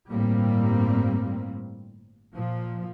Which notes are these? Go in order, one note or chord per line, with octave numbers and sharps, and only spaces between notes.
G1 A2 G3 A#3 C4
A#2 F3